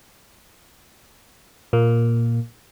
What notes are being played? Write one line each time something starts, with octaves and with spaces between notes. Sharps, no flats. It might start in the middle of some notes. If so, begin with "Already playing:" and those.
A#2 A#3